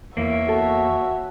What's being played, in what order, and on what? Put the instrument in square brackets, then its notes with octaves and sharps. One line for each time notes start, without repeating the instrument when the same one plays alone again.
[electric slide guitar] E2 A#3 [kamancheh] C#5 E5
[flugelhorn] F#4 [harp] A4